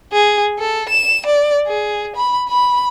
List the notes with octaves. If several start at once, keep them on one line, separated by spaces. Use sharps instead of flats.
G#4
A4
E7
D5
G#4
B5
B5